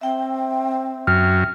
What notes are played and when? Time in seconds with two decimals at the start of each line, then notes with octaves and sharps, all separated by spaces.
0.01 C4 E5 G5
1.07 F#2 F6